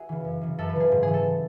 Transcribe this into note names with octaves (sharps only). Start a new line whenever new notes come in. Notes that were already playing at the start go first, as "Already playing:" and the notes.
Already playing: E4 F#4 G#4
C#3 E3
F#2
C#3 E3
F#2 A4
B4
C#3 E3 G#4
G#2
G#4
E3
A4